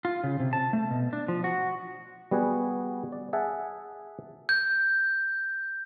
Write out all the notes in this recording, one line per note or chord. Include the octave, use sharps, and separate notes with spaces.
F4
C#3
C3
A5
A3
B2
D4
F3
F#4
G3 B3 F#4 G#4 F#5
D5
G#4 E5 F#5 A5
G6